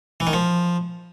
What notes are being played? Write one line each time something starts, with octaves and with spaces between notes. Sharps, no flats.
E3
D#3
F3